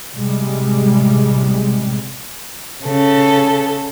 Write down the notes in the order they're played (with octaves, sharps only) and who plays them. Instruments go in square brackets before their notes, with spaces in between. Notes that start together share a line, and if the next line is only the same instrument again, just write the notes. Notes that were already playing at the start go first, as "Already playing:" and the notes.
[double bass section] A1 C3 G3 G#3
[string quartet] C#3 A4